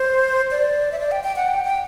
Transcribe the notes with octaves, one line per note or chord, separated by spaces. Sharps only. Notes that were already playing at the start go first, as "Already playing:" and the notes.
Already playing: C5
D5
E5
D5
G5
G5
F#5
G5
G5